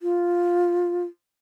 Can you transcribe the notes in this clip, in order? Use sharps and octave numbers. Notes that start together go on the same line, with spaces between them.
F4